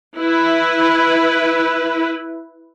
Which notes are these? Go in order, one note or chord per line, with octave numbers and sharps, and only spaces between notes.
E4 B4